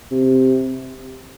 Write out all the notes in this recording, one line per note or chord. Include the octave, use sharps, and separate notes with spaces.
C3